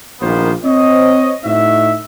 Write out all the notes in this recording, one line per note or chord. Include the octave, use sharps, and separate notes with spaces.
A#1 A#2 D#3 A#3 B3 C5
C4 C5 C#5 D#5
A2 D#4 F#4 E5